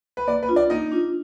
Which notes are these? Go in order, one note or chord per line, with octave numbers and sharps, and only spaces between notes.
B4
A#3 D5
B4
D4 F4
D5
A#3 D#4 D#5
D4 F4